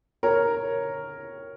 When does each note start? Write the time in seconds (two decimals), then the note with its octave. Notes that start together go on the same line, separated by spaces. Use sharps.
0.23 A#4 C#5